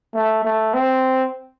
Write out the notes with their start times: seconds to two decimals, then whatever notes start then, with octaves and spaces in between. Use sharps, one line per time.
0.15 A3
0.45 A3
0.74 C4